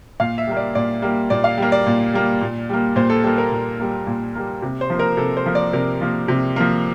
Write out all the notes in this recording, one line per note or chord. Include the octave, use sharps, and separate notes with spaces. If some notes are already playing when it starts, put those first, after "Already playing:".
A#2 F5
E5
G3 A#3
D5
A#2 D5
G3 A#3
A#2 D5
F5
G3 A#3
D5
A#2
G3 A#3
A#2
G3 A#3
A#2 C5
A4
G3 A#3 A4
A#4
A#2
G3 A#3
A#2
G3 A#3
C3
C5
F3 A#3
A#4
C3 A4
C5
F3 A#3
D5
C3 A#4
F3 A#3
C3
F3 A#3